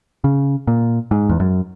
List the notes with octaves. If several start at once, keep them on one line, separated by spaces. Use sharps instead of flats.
C#3
A#2
G#2
E2
F#2